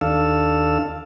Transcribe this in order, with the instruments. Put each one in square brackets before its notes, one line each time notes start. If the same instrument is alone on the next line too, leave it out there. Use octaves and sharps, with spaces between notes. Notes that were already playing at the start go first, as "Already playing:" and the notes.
[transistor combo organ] D#2 D4 A4 F5 E6